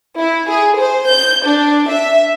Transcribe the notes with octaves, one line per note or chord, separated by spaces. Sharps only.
E4
G#4
C5
G6
D4
E5